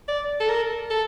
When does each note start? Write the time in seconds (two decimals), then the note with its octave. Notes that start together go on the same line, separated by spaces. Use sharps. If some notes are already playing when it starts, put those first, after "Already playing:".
0.08 D5
0.40 A4
0.50 A#4
0.90 A4